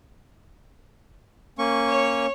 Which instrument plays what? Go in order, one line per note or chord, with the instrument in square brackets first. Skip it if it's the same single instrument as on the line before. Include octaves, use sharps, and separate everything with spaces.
[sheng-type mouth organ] A#3 C#4 C#6
[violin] C#5